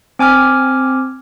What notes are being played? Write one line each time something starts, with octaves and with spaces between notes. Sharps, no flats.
C4 G#5 D6 F6